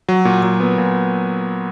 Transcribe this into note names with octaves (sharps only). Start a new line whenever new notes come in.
F#3
A#2
F#3
B3
A#2